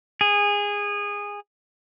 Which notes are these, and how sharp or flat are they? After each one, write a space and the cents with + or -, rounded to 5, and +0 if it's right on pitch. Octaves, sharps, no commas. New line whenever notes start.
G#4 -20